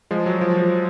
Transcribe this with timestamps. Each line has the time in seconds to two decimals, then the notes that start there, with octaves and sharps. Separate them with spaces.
0.11 F3 G#3
0.26 F#3
0.41 F3
0.57 F3